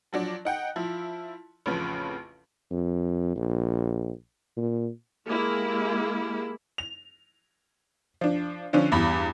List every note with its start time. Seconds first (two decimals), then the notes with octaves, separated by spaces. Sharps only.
0.13 F3 F#3 D4
0.45 D#4 F#5 G5
0.76 F3 E4
1.66 A1 F2 C#3 F3 F4 B4
2.71 F2
3.36 A#1
4.57 A#2
5.27 G#3 A#3 E4 G4 G#4
6.78 F7
8.21 F3 D4
8.73 D3 F3 C#4 D4
8.92 E2 G2 B5